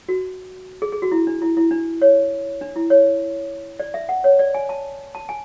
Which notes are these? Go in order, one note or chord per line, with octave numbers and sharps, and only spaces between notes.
F#4
G#4
G#4
F#4
E4
D4
E4
E4
D4
C#5
D4
E4
C#5
D5
E5
F#5
C#5
D5
G#5
A5
A5
G#5